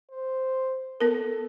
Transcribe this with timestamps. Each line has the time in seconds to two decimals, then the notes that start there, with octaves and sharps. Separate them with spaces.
0.10 C5
1.01 B3 A4 A#4